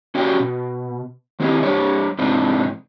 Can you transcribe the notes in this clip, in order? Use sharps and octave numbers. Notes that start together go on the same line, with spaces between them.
C#4 F#4 G4 D5 F5 G5
B2
D#3 C4 E4 G4 C#5 D#5
G3 D4 G4 C5 C#5
G#2 C3 E3 C4 D4 D#4